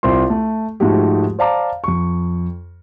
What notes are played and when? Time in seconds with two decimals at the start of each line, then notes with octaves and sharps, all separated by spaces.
0.03 C2 C4 F4 C6
0.30 A3
0.80 G#2 F3 G#3 A3 F#4 G4
1.39 C5 D5 F5 A5 A#5 D6
1.84 F2 C#6